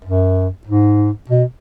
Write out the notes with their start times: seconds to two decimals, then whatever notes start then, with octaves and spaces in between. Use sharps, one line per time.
0.05 F#2
0.67 G#2
1.29 B2